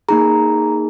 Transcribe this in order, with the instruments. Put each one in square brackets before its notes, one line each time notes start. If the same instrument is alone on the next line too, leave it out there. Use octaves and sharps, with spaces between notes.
[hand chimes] A#3 D#4 G#4 A#5